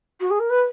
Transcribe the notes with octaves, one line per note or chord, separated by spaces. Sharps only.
F#4
G#4
A#4
B4